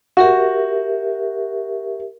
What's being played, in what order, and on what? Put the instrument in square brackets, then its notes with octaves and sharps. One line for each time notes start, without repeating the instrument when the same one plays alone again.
[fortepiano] F#4 [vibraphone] G4 A#4 E5